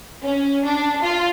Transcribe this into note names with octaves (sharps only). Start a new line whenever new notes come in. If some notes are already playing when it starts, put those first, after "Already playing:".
C#4
D4
F4